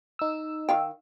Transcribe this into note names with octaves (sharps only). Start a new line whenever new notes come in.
D#4 E6
D#3 F5 G5